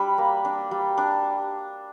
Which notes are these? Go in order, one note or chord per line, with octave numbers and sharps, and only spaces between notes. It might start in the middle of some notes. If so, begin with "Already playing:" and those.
Already playing: G3 D4 B5
A#3
D4
G3
D4